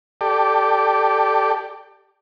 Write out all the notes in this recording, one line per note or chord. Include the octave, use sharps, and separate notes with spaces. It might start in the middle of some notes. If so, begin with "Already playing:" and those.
G4 A4 D5